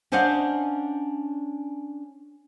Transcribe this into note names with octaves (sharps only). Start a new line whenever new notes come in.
C#4 D4 C5 D#5 F5 F#5